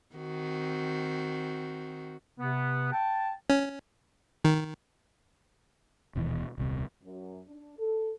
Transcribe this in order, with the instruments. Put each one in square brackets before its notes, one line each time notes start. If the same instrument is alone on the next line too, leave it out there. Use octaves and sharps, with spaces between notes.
[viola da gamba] D#3 C4 F#4
[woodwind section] C3 B3
G5 A5
[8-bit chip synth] C#4
D#3
[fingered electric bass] D#1 D#2 B2 E3
D#1 C2 C3
[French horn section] F#2
D4
A4